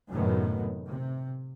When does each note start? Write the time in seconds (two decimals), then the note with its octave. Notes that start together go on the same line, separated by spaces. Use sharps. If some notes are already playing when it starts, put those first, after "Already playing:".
0.10 F#2 A2 C3 D#3 F#3 B3
0.87 C3